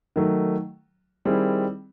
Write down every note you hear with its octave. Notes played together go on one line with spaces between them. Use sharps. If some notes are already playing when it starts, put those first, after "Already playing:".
D#3 F#3 A3
D#3 G3 C4 E4 G#4